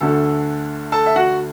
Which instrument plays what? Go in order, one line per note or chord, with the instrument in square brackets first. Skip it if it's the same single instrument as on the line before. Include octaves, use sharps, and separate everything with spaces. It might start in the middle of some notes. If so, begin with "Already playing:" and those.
[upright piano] D2 D3 A3 A4
A4 A5
E5
F#4 F#5